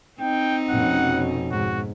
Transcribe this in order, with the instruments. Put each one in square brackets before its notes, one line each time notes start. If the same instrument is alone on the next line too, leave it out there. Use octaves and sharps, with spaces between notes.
[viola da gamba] C4 D#4 [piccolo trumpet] G5
[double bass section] F1 B2 C#4 [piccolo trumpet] F#5
[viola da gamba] G#2 [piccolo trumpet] F#4